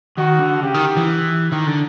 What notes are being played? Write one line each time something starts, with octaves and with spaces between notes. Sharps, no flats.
D#3 F#4
D3
C#3 G4
D#3
E3
D#3
D3